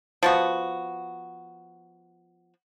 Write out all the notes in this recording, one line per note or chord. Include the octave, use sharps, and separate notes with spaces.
F3 B3 F#4